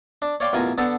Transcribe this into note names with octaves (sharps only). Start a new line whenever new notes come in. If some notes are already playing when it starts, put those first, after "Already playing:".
D4
C#5 D5 F5 G5 C6 D6
A1 B2 F4 A#4 G#5
D3 B3 A4 A5